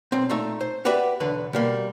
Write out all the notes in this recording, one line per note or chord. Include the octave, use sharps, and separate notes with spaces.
B1 C4
A#2 A3 D#4 E5
C5
F#4 G4 B4 D5 E5 F#5
B1 E2 D3 B4 B5
B2 G3 A#3